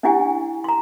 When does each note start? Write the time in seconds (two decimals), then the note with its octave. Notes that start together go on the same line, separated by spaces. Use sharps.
0.03 C#4 D4 E4 G4 F#5 G#5
0.64 A#5 C6